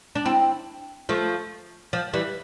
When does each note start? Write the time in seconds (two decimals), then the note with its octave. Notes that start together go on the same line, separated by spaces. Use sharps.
0.15 D4
0.26 C4 E4
1.09 F3 A3
1.93 F3
2.14 E3 G3